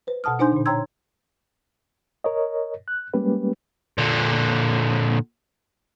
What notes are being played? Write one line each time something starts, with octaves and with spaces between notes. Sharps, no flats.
B4 C5
B2 F#5 A5 D#6 F6
D4 D#4 C5 G#5 C6 G6
A#2 D3
C#5 G5 A#5 C6 E6 G#6
A#4 C#5 D#5
F#6
G3 G#3 A#3 C#4 G4 B4
A#2 D3